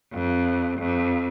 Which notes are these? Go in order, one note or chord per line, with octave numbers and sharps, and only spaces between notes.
F2
F2